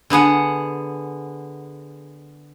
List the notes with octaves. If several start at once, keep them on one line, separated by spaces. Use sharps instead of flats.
D3 B3 G#4 F#5